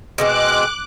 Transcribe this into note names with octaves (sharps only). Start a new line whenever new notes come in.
B2 G#3 C4 D6 F#6